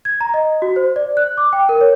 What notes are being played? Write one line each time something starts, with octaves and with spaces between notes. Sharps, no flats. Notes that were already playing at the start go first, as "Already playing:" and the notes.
G#6
A#5
D#5
F#4
C5
D5
F#6
D6
G5
A#4
C#5